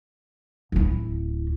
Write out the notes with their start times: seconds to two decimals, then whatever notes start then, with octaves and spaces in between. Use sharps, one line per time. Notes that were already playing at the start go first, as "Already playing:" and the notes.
0.72 D1 E4